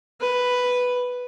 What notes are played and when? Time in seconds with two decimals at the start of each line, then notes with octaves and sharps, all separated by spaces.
0.21 B4